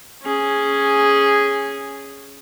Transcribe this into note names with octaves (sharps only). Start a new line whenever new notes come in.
C#4 G#4